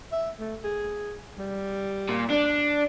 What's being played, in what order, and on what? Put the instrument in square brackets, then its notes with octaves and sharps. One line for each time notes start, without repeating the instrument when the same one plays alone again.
[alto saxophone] E5
A3
G#4
G3
[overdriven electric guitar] A#2
D4